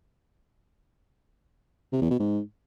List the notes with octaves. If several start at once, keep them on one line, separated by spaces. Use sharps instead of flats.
C3
E2
B2
G#2